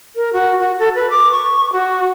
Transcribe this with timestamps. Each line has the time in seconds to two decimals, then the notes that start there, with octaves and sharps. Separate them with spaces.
0.16 A#4
0.33 F#4
0.60 F#4
0.79 A4
0.95 B4
1.10 D6
1.31 C#6
1.73 F#4